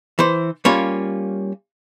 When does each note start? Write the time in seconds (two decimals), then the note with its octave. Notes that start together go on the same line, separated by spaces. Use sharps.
0.19 E3 C5
0.65 G3 A#3 C#4 F4 C#5